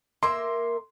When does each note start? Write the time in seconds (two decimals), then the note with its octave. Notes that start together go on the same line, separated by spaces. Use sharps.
0.23 A#3 A#4 E5 C6